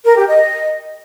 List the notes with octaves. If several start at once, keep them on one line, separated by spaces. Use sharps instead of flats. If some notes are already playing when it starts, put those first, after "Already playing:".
A#4
G4
D#5